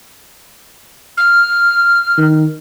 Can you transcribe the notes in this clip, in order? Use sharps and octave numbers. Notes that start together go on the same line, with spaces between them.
F6
D#3